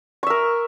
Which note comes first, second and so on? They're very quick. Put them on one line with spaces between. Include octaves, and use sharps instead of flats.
C#6 E5 A#4